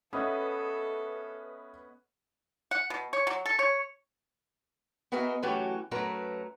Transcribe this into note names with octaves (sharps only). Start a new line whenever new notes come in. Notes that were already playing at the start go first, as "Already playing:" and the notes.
B3 C#4 A4 B4 D#5 E5 D#6
F#5
B2
C#5
F#3
A4
C#5
B3 F#4 G#4 A#4 D#5 E5
E3 F#3 A3 C#4 F#4 G4
F#2 F#3 A3 A#4 B4 A#5